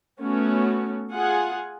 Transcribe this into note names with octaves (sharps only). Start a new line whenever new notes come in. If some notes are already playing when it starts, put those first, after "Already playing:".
A3 B3 C#4 F#4
F4 G#4 F#5 G#5